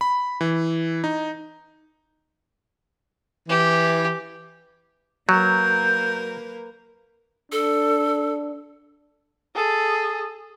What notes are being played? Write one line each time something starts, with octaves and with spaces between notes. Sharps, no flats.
B5
E3
D#4
E3 G4
F#3 A#3 A#4 B4 G6
D4 A4
G#4 A4